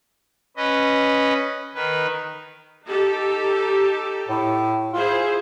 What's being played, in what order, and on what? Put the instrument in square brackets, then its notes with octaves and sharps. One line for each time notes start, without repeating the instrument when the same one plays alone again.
[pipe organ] C#4 B4 D#5
D#3 B4
[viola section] D#4 G4 A4
[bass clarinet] A2
[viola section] E4 G#4 C5 [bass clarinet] F4